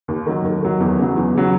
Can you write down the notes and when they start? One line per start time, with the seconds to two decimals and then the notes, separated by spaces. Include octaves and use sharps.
0.08 D#2
0.27 D#3 F#3
0.44 D#2
0.63 D#3 F#3
0.80 E2
0.98 C#3 F#3
1.16 E2
1.35 C#3 F#3